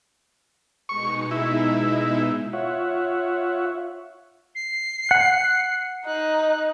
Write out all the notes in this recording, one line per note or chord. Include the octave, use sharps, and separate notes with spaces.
B2 G#3 D#4 C#6
E4
F4 C#5 E5 F#5
C7
F#5
D#4 F#6